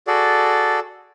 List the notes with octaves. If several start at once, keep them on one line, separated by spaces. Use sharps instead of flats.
F#4 G#4 A4 D5